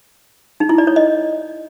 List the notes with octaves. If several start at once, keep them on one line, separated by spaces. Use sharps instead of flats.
D#4
E4
D5
C#5
D#5